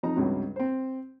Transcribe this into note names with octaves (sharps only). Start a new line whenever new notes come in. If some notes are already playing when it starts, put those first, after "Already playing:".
F2 F3 D#4 A#5
C#2 G2 C3 F#3
C4 C5